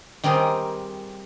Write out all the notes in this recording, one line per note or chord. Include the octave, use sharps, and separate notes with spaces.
D#3 G3 C4 G#4 A#4